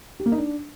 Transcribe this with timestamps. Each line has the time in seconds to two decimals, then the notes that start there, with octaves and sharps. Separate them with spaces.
0.20 G4
0.26 A#3
0.32 D#4
0.38 D4